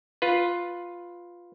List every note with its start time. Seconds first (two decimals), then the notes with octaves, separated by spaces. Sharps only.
0.22 F4 B4